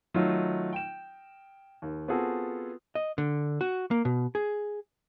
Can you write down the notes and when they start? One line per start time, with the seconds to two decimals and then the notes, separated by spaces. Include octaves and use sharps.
0.14 D#3 F#3 A3 D#4 F4
0.73 G5 E7
1.82 D#2
2.08 B3 C4 F4 F#4 G#4 A4
2.95 D#5
3.18 D3
3.61 F#4
3.91 A#3
4.05 B2
4.35 G#4